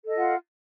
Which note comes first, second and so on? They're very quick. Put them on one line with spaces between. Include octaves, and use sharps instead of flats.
A4 D#5 F4 F#5